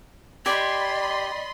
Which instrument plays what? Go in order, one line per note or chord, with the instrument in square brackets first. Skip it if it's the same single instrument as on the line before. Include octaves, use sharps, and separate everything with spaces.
[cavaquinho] G4 G#5 [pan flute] D5 [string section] D#5 B5 C6